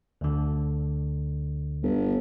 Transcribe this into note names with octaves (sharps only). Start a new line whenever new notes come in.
D2 D3
G1